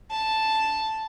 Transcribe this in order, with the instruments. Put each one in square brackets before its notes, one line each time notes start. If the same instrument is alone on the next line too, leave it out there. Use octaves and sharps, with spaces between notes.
[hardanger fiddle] A5